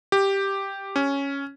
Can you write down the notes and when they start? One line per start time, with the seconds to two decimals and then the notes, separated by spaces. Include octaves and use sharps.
0.12 G4
0.96 C#4